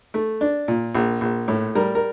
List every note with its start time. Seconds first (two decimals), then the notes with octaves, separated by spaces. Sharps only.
0.14 A3
0.41 D4
0.68 A#2
0.95 A#1
1.21 A#1
1.48 A2
1.75 G3 A#4
1.95 A#4